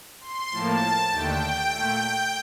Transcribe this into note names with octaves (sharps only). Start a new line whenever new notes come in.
C6
A2 F3 A#3 A5
D#2 D3 A3 G5
A#2 A3